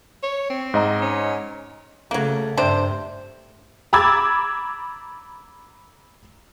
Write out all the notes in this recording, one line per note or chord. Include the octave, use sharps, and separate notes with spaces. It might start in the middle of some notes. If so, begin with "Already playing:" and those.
C#5
C4
G#2 D#5 A#5
C#4
C#3 F#3 A3 A#3
G2 C3 D4 C5
A#5 B5 D6 E6 G#6 A6